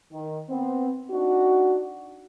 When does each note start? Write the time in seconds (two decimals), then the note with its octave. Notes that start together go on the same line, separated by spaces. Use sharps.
0.12 D#3
0.49 B3 C4
1.11 D4 D#4 F#4